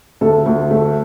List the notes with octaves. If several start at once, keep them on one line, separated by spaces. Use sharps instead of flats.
D2 A4
D2
A3